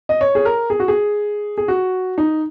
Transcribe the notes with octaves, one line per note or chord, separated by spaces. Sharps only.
D#5
C#5
G#4
A#4
G#4
F#4
G#4
G#4
F#4
D#4